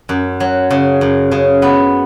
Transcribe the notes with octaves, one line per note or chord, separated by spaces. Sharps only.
F#2
F#3
C#3
F#2
C#3
B3